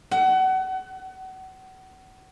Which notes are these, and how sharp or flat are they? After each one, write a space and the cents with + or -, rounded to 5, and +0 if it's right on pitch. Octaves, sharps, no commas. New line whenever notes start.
F#5 +30